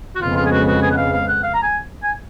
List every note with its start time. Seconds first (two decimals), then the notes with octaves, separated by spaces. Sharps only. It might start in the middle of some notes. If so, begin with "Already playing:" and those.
0.15 F#4
0.21 F2 C#3 G#3 B3 F4
0.36 F4
0.46 G#4
0.51 F#4
0.67 F#4
0.82 G#4
0.91 F#5
0.97 F5
1.13 F5
1.28 F#5
1.43 F5
1.54 A#5
1.63 G#5
2.03 G#5